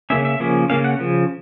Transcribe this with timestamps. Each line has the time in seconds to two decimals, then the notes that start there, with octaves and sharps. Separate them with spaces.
0.10 C#3 F3 A#3 C#4 E5
0.25 E5
0.40 C#3 F3 A#3 C#4
0.70 C#3 F3 A#3 C#4 F5
0.84 F#5
1.00 C#3 F3